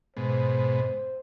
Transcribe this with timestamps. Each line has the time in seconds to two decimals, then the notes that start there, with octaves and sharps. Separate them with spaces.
0.17 G#2 B2 C5